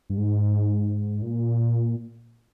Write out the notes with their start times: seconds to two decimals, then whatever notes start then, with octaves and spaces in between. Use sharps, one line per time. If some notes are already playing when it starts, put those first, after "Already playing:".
0.10 G2
0.18 G#2
1.22 A#2